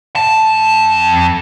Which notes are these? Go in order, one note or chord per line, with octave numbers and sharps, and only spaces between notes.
F2 A5